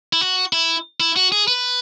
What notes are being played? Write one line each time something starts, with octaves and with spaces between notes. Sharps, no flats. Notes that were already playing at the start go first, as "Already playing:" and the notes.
E4
F#4
E4
E4
F#4
G#4
B4